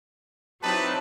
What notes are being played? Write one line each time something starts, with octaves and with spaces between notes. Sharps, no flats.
F#3 C4 D#4 E4 G4 B4 A5